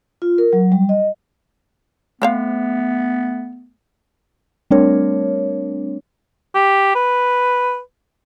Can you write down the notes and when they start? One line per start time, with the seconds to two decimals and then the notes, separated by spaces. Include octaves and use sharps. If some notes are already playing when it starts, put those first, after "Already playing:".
0.22 F4
0.38 A#4
0.53 F#3
0.72 G3
0.89 D#5
2.22 A3 B3 C4 C5 F5
4.71 G3 A3 C4 D4 A#4 C#5
6.55 G4
6.95 B4